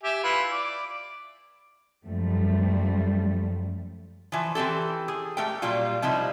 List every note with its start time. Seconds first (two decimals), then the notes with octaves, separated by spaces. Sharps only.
0.03 G4 E5 G#5
0.24 E4 F4 B4
0.52 D5
2.06 F#2 F3 G3 A3
4.32 E3 F3
4.55 E3 C4 G4 A4
5.08 G#4
5.37 A3 G4 A#4 G5
5.62 A#2 F#3 G3 A#3 F4
6.02 C3 F3 G3 D#4 E4